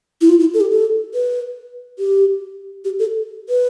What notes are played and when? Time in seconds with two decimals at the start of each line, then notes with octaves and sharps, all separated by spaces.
0.21 E4
0.29 F4
0.40 E4
0.54 A4
0.61 G4
0.71 A4
1.14 B4
1.99 G4
2.85 G4
2.99 A4
3.49 B4